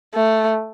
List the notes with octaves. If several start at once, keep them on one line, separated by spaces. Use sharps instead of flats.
A3